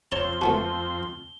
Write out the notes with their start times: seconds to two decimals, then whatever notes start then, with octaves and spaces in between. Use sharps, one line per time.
0.12 F2 C4 C#5 A5 A#5 G7
0.41 A3 B3 F#4 A5